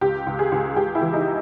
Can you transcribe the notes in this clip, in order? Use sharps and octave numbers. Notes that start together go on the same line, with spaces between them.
C#2 G4
C#2
G#4
C#2
C#2 G4
E4
E3
D#4